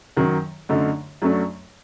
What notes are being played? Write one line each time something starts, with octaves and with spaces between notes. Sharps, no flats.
F#2 D#3 F#3
F#2 D3 A3 D#4
F#2 F#3 A3 D4